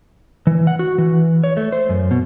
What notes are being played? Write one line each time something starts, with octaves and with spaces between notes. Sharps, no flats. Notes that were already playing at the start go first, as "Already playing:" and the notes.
E3
F#5
F#4
E3
C#5
A3
C5
F#2
B2